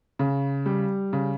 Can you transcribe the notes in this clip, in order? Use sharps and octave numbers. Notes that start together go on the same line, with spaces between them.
C#3
G3
C#3